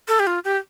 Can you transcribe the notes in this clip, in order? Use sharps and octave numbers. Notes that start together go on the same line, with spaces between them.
A4
G4
F4
G4